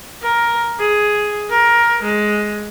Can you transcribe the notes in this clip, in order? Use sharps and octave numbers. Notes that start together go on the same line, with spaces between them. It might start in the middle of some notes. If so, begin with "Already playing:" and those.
A#4
G#4
A#4
G#3